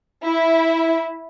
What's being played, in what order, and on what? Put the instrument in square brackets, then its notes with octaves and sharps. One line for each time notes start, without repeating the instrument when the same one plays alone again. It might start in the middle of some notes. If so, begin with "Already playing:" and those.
[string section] E4